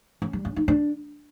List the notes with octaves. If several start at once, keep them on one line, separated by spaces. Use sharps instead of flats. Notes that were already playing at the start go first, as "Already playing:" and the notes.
C#4
G3
C#4
D#4
D4